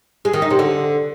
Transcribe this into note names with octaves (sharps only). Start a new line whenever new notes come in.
G#3
D#3
D#4
C3
D3